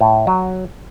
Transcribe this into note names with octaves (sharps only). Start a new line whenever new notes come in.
A2
F#3